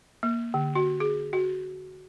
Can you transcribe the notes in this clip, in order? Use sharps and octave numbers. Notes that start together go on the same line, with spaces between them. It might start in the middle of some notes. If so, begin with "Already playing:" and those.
A#3
D3
F#4
G#4
F#4